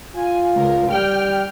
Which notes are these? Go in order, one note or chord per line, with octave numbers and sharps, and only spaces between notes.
F4 G#5
C#2 A#4
G3 G5 F6